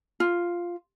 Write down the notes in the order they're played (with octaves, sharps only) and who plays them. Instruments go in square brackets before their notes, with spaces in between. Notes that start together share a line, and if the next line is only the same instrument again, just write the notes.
[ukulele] F4